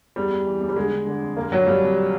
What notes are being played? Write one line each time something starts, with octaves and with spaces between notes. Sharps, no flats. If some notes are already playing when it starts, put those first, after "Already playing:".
E2 G3
E2
E3
E2
G3
D3 G#3
D3
D3
F2
C2 A#3
A#2 F#3
A#2 G3
C2